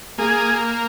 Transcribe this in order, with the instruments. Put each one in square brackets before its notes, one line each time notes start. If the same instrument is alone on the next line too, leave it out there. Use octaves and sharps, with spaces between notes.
[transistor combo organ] A#3 G#4